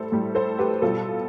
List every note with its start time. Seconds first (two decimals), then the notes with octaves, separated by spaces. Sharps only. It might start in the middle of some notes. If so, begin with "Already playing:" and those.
Already playing: A2 G3 A4 C5
0.12 A2 G3
0.35 A4 C5
0.59 G4 B4
0.82 B2 G3 F4 A4